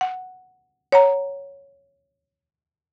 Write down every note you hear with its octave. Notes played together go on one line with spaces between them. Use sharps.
F#5
C#5 F#5 A#5